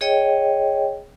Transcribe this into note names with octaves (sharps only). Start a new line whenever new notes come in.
G#4 C#5 D#5 G5